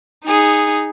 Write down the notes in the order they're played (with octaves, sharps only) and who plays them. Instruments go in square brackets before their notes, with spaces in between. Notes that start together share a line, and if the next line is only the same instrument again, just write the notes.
[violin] D#4 G#4